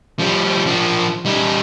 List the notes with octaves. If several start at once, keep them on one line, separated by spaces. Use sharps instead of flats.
F3 G3
F3 D4
G3 D#4